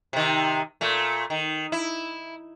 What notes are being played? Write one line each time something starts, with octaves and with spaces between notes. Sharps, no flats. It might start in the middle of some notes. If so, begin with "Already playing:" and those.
C3 D#3
A#2 A3
D#3
E4